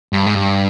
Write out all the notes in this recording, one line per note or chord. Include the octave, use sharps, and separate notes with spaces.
G2
G#2
G2